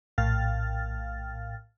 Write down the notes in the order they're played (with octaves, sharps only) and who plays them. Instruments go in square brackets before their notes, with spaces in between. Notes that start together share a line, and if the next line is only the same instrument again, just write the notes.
[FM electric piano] A#1 A2 F5 G5 F6 A6